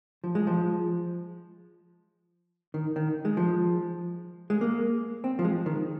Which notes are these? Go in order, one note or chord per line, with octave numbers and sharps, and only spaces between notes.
F3
G#3
F3
D#3
D#3
G#3
F3
G#3
A#3
C4
F3
G#3
D#3